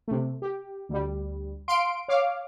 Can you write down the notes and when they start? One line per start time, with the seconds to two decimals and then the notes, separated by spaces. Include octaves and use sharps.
0.08 C3 A3
0.42 G4
0.89 D2 G3
1.68 F5 C6 D7
2.08 C#5 F5 D6